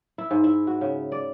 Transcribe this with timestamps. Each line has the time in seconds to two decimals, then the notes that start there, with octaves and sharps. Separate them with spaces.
0.18 E4
0.31 G#2
0.44 E4
0.67 F#4
0.81 C#3
1.12 D5